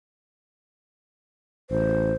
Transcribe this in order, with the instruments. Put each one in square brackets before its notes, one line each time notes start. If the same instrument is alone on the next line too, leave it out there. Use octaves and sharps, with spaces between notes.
[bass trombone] A1 [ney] C5